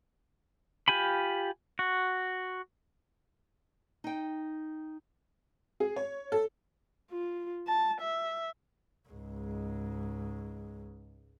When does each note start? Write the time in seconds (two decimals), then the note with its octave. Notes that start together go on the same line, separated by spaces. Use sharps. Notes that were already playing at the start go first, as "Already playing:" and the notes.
0.88 F4 G4 G#5 B5
1.79 F#4
4.04 D#4 G5
5.80 G#4
5.96 C#5
6.32 A4
7.11 F4
7.68 A5
8.01 E5
9.10 C#2 G#2